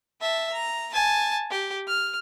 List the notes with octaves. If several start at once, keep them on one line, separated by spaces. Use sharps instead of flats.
E5 A5
A#5
G#5 A5
G4
F6